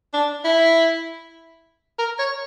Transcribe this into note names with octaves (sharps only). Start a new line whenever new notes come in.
D4
E4
A#4
C#5